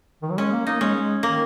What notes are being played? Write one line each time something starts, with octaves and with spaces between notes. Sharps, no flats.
D#3
F#3
G#3 C#4
A#3
A#3 D#4
G#3 C#4
G#3
D#3 A#3